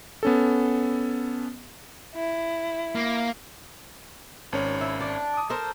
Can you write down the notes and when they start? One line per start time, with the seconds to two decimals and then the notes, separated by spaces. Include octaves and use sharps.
0.23 B3 C#4 A4
2.13 E4
2.95 A#3
4.53 G#1 C#4 C#5
4.81 E4
5.01 D4
5.34 D6 D#6
5.50 A4 A#4 C5